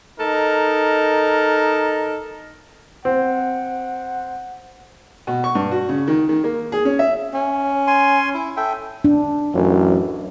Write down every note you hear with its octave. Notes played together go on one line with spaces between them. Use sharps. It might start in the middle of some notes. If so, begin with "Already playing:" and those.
D#4 A4 A#4
C4 F#5
B2
C#6
G2
F#4
C#3
D#3
D#3
A#3
G#4
C#4
E5
C#4
G#5 C6
E4
A4 E5 G5
D4
A1 F#2